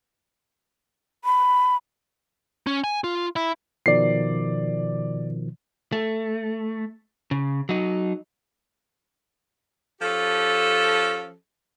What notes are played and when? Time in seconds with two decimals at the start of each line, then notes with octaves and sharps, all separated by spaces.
1.25 B5
2.67 C#4
2.84 G#5
3.04 F4
3.36 E4
3.86 B2 D#3 F3 D5 C7
5.92 A3
7.31 C#3
7.69 F#3 D#4
10.01 F3 C#4 G4 A4